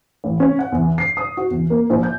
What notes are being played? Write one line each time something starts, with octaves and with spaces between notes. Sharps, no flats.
A1
C#4
F#5
E2
C7
D#6
F#4
E2
A#3
A#1
G6